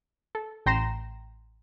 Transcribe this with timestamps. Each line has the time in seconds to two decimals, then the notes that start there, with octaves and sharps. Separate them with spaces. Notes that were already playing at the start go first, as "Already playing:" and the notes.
0.35 A4
0.66 A1 G5 A#5 C6 A#6 E7